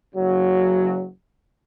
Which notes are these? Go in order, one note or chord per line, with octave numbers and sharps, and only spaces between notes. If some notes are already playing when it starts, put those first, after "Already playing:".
F#1 C#3 F#3